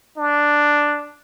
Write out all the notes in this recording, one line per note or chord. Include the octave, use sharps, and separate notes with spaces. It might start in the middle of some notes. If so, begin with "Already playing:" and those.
D4